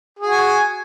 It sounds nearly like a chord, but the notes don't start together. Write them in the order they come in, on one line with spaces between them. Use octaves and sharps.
G#4 F#4 G#5